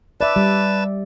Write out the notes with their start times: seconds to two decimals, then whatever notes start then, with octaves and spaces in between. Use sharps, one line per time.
0.21 B4 D5 E5 A5
0.36 G3